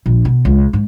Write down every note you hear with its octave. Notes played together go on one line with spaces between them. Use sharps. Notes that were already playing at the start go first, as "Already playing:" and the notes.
A#1
B2
C#2
G#2